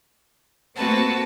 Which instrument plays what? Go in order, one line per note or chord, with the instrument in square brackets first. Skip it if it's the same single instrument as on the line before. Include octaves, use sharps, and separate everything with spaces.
[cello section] A3 C4 F#4 [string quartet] A#3 B4 A5